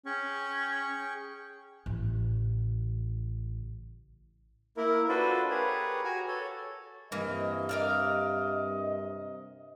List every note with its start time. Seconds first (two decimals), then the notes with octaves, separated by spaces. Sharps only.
0.06 C#4 G#4 G5 C#6
1.86 A1 C#3
4.77 A#3 E4 A#4
5.09 D4 F4 F#4 A4 B4 C5
5.50 G4 G#4 A#4 B4 C#5
6.04 F#4 G#5 A#5
6.27 A4 C#5
7.12 G2 C3 E3 A#3 D#5
7.69 A#4 D5 F5